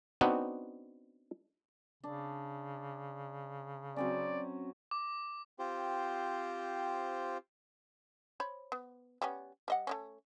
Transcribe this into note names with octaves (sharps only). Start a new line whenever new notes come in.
B3 C4 D4 D#4 F#4
C#3 D4
F#3 C4 C#4 D5
D6
C4 F4 G4 C5
C5 C#5 B5
B3
G3 B3 C#4
G3 D#5 F#5
A3 A#3 C#4